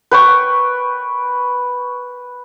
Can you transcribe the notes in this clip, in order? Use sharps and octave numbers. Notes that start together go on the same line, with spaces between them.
B4 G5 C#6